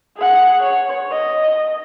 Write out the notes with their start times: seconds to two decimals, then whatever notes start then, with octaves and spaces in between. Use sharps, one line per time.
0.17 G#4 F#5
0.61 C#5
1.11 D#5